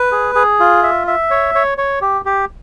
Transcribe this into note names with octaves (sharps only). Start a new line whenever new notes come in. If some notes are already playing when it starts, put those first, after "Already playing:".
Already playing: B4
G#4
G#4
F4
E5
E5
C#5
C#5
C#5
G4
G4